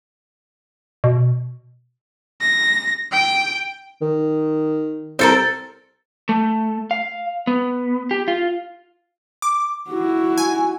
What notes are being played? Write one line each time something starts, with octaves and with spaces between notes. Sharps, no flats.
B2
A#6
G5
D#3
C2 C4 A4 A#4
A3
F5
B3
G4
F4
D6
E4 F#4
G#5